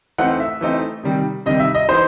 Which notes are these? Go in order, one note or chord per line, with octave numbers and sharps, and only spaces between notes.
E3 A3 C4 D#4 F#5
E5
E3 A3 C4 D#4
C3 D#3 G3
C3 D#3 G3 D#5
E5
D#5
E3 B3 D#4 C5